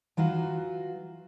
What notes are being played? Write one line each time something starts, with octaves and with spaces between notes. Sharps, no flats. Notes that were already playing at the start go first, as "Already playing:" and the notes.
E3 F#3 F4 F#4